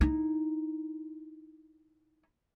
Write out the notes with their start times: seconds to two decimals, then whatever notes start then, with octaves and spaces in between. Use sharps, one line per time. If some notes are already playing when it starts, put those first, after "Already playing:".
0.01 D#4 E4